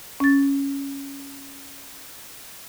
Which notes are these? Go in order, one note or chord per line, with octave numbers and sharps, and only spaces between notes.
C#4 A6